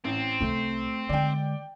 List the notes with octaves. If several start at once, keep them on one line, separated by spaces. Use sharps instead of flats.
A1 C4
C2 C3 A3
D3 G#3 D5 G5